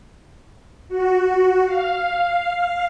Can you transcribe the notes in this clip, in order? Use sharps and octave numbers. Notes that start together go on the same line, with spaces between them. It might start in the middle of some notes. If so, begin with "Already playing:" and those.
F#4
F5